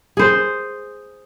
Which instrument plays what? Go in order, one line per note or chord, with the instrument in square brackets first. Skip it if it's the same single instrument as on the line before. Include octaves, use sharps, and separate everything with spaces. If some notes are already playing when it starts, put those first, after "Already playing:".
[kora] G#4 C5